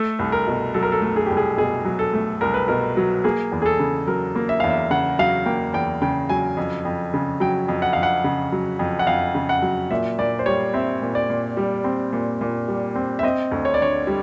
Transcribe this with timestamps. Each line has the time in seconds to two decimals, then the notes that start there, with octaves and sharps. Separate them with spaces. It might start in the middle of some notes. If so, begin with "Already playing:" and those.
Already playing: A3 A4
0.19 C2
0.32 A#4
0.47 B2
0.74 F#3 A4
0.83 A#4
0.92 A4
1.02 A3
1.16 G#4
1.26 C2 G4
1.37 G#4
1.57 B2 G#4
1.85 F#3
1.99 A4
2.14 A3
2.41 C2 A#4
2.54 B4
2.68 B2 A#4
2.97 F#3
3.24 A#3 G#4
3.52 E2
3.62 G#4
3.66 A4
3.80 C#3
4.07 F#3 A#4
4.36 A#3
4.49 E5
4.60 E2 F5
4.70 E5
4.90 C#3 F#5
5.19 F#3 F5
5.46 A#3 G5
5.74 E2 G5
6.02 C#3 G5
6.29 F#3 G#5
6.57 F2
6.85 F2
7.14 C#3
7.40 F#3 G5
7.68 F2
7.82 F#5
7.93 F2 F5
8.03 F#5
8.24 C#3
8.52 F#3
8.79 F2
8.99 F#5
9.07 F2 F5
9.35 C#3
9.49 F#5
9.62 F#3
9.91 A#2 E5
10.18 A#2 D5
10.39 C5
10.46 G3 C#5
10.74 C4 E5
11.02 A#2
11.15 D5
11.30 A#2
11.57 G3
11.84 C4
12.12 A#2
12.41 A#2
12.68 G3
12.95 C4
13.19 E5
13.23 C4 D#5
13.51 D2
13.65 C#5
13.74 D5
13.80 D3 C#5
14.07 G3